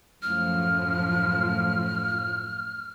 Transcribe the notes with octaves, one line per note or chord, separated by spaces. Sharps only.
F#2 A2 F3 F6